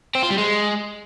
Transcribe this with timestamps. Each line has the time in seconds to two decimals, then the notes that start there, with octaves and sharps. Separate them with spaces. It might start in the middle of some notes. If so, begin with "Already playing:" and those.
0.15 C4
0.23 F4
0.30 G3
0.38 G#3